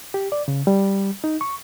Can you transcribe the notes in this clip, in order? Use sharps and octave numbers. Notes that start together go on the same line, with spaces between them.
G4
D5
C#3
G3
D#4
C#6